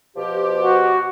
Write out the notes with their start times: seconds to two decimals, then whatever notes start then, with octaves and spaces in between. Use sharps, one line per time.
0.16 B2 F3 G4
0.63 F#4